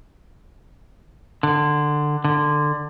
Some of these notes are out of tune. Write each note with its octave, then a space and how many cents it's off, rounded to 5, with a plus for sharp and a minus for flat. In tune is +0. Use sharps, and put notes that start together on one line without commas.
D3 +15
D3 +15